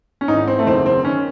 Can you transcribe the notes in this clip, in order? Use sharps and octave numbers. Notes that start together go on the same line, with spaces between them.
C#4
G#1 G#2 E3 D#4
C4
A3
F#1 E2 D#3 C4
C4
D#3 C#4